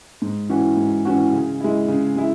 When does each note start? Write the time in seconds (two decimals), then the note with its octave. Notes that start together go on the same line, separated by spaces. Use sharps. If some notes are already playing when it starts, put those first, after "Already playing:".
0.22 G#2
0.50 E3 C#4 F#4
0.77 G#2
1.05 E3 C#4 F#4
1.33 C#3
1.60 G#3 E4
1.88 C#3
2.16 G#3 E4